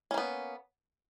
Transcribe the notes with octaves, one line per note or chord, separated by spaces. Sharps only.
A#3 B3 C#4